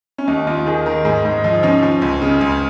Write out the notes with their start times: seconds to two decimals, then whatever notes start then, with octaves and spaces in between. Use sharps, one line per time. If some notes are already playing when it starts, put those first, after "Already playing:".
0.18 C#4
0.27 D#2 D#4
0.47 D#2 F4
0.66 D#3 G#4
0.86 D#3 A#4
1.05 G#2 G#4
1.25 G#2
1.44 F3 D#4
1.63 F3 C#4
1.83 F3
2.02 C#2
2.22 C#3
2.41 C#2